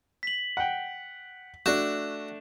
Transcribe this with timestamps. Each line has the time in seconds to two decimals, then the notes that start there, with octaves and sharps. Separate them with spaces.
0.23 B6 F#7
0.57 F#5 G5
1.66 A3 D4 F#4 E7